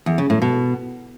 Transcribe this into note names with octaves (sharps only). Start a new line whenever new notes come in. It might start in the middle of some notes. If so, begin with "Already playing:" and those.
E2
C#3
A2
B2